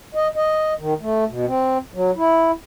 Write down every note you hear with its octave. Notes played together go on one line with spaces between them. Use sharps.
D#5
D#5
D#3
A3
B2
C4
F#3
E4